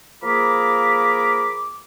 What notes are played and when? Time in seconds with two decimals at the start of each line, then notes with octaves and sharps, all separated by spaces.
0.22 F3 A#3 G#4 A#4 B5 D6